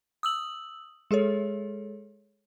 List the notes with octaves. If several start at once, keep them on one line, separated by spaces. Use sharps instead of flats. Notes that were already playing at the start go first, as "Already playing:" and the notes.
D#6 E6 F#7
G#3 G#4 A4 C#5